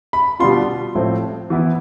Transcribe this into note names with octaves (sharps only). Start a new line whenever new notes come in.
B5
B2 G3 B3 D4 F4 C6
A2 F3 C4
E3 B3 E4